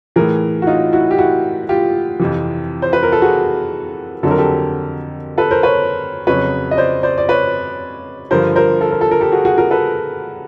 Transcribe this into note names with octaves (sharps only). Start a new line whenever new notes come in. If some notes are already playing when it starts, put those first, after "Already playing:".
A2 E3 G#4 A#4
F#4
D#4 F4
E4 F#4
G4
E4 F#4
F4 G4
F2 C3 E3
C5
B4
A#4
A4
F#4 G#4
F2 D3 F#3 A4
A#4
G4 A4
A4 B4
A#4 C5
B4 C#5
F2 C#3 F#3 B4 C#5
D#5
C5 D5
C5 D5
D5
B4 C#5
G2 D3 F3 A#4 C5
A#4 C5
A4
A#4
A4
A#4
G4 A4
F#4 G#4
F#4 G#4
G#4 A#4
A4 B4